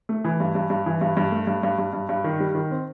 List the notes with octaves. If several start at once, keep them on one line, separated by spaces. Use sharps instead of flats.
A3
E3
G2
G2
G2
E3
G2
G2
A3
G2
G2
G2
G2
G2
D#3
G3
D#3
C4